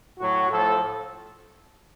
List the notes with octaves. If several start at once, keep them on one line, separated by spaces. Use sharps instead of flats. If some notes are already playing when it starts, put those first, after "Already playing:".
A2 F#3 F#4
A2 F3 A4